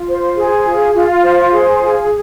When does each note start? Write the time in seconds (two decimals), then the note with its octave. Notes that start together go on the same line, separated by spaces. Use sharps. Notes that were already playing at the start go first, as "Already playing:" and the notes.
Already playing: F4
0.08 C5
0.37 G#4
0.66 F4
0.94 F4
1.23 C5
1.53 G#4
1.81 F4